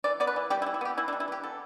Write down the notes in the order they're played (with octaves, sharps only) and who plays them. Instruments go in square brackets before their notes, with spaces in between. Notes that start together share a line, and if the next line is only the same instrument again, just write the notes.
[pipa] E3 D5
B3 D5
B4
E3
G3 G4
E4
E3
E4
B3 G4
E3 E4
D4
G3
E4
E3 G4
B3 A4